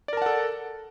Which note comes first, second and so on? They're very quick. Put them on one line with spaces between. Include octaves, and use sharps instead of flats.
D5 A#4 A5 F#5 A4